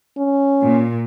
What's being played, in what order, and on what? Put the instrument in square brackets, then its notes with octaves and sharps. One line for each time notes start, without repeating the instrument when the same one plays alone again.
[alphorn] C#4
[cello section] A#2